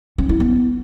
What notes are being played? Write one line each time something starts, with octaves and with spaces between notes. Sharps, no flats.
C#4
E4
B3